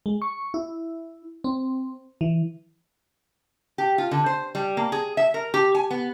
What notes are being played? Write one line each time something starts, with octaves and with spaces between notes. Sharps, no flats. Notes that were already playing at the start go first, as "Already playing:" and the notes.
G#3
C#6
E4
C4
E3
G4
F4
D3
C5
G3
A#3
G#4
E5
A#4
G4
G#5
B3